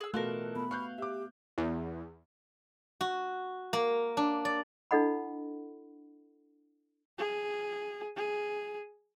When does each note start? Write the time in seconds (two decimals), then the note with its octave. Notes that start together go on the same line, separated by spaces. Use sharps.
0.01 G#4 E6
0.14 B2 E3 A3 F4 F#4 A4 A#4 F#6
0.56 B3 B5
0.71 F5 C#6 F#6 G6
0.98 G4 E5 D6
1.58 E2
3.01 F#4
3.73 A#3
4.17 D4
4.45 D5
4.91 D4 E4 A4 D#5 F#5 B5
7.18 G#4
8.16 G#4